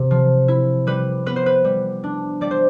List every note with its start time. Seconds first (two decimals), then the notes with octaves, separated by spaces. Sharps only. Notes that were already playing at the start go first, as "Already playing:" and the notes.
Already playing: C3
0.11 F3
0.48 E4
0.87 G3 B4
1.26 B3 B4
1.36 C5
1.46 B4
1.65 G3
2.04 D4
2.41 G3 D5
2.51 C5